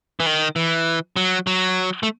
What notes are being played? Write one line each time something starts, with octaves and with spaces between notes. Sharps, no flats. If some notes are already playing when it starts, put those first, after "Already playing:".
E3
D#3
E3
F#3
F#3
A3